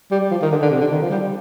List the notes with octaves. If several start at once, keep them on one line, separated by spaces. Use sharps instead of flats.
G3
F3
D#3
D3
D3
C3
D3
D#3
F3
G3